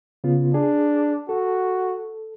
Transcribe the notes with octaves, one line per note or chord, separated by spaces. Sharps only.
C#3 B3 F4
D4 G#4
F#4 A4